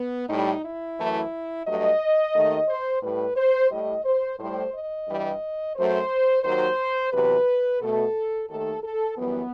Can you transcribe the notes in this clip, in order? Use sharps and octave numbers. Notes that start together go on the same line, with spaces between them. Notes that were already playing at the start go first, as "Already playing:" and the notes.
Already playing: B3
A2 G3 D#4
E4
F#2 E3 A3
G2 F#3 A3 D#5
D#2 D#3 A3
C5
A2 G3 B4
C5
A2 G3 D#5
C5
A2 G3 C5
D#5
G2 E3 G3
F#2 F#3 A3 C5
D#2 D#3 F#3 C5
E2 C3 F#3 B4
B2 A3 A4
D#2 D#3 A3 A4
A4
F#2 E3 G3 B3